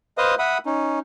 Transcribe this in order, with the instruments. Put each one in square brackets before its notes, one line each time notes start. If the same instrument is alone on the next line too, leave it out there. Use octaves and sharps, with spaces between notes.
[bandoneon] B4 C5 D#5 F5 D#6
E5 F#5 B5 D#6
C#4 D#4